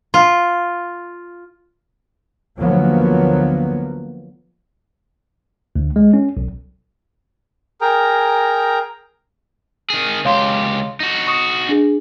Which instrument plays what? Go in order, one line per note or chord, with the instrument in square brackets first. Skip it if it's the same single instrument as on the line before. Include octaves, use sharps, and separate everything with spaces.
[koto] F4
[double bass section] D2 F3 F#3 A#3 B3
[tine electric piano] D2
G#3
C#4
B1
[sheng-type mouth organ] G#4 A#4 G5 A#5
[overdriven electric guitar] D#3 G#4
[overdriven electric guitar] C#2 G4 [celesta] C#5 F5 C6
[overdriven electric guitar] D#4 F#4
[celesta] C#6 D#6 C#7
D4 G#4